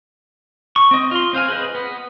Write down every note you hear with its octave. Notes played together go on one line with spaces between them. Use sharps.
C#6
C4 D#5
F4 C6
C4 C5 F5 G#5
G#4 B4 C5 D#5
B3